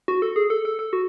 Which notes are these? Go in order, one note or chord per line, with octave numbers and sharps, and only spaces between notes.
F#4
A4
G#4
A4
A4
A4
F#4